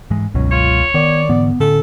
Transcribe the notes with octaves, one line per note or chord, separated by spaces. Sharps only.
G#2 E3 G#3
G1 C#2 B2 F#3 C#4
F4 C#5
D#3 B3 D5
G#2 D3 E3 B3
A2 D3 C#4 A4